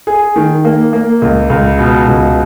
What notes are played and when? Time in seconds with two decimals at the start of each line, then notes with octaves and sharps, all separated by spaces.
0.07 G#4
0.36 D#3
0.65 A#3
0.93 A#3
1.22 C#2
1.50 C#2
1.79 B2
2.08 C#2